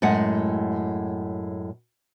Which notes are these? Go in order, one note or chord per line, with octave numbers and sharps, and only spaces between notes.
F#2 A2 G#3 F#5